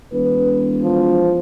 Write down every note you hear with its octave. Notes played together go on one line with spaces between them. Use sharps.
E1 B4
F3